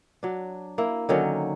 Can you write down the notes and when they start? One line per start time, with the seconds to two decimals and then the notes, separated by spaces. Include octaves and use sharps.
0.23 F#3 D4
0.78 A#3 E4
1.09 D3 D#3 F#3 C#4